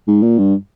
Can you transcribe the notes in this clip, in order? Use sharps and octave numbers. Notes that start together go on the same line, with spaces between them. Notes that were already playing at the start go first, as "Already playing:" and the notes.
G#2
A#2
G2